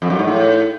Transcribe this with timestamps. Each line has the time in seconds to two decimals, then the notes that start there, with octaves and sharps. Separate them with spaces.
0.02 F2
0.10 F#2
0.19 G#2
0.28 A2